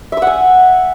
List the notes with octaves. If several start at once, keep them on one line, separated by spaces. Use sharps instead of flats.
E5 F#5 G#5 E6